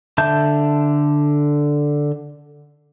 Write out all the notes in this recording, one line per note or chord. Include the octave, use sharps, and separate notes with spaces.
D3 E5 A5 G6